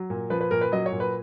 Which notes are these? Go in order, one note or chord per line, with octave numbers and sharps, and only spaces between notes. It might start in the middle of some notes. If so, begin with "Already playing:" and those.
Already playing: F#3
A#2
F3 B4
B4
A#2 A#4
B4
F#3 D#5
C#5
A#2
B4